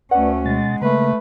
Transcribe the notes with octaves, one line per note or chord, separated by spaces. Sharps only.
D2 A3 C#4 B4 D5 F#5
B2 G#3 A6
C#3 A3 A#3 B4